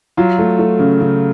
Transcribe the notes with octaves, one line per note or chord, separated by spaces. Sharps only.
F#3 F4
A3
A3
C#3
C#3